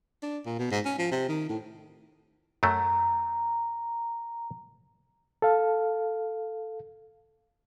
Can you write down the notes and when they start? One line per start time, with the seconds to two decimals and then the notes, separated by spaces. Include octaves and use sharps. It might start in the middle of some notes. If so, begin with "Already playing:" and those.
0.23 D4
0.46 A#2
0.59 B2
0.71 G#2
0.85 C#4
0.98 F3
1.11 C3
1.29 D#3
1.49 A2
2.63 F#2 F#3 A3 A#5
5.42 A4 F5